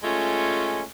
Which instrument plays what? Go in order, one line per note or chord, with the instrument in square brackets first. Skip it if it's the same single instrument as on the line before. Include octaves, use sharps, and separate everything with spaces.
[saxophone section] G#3 A3 C#4 F4